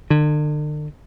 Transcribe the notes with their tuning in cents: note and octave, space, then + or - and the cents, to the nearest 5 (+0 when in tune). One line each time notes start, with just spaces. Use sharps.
D3 +40